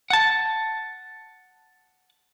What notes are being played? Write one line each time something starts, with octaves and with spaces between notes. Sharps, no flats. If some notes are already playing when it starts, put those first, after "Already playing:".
F#5 A5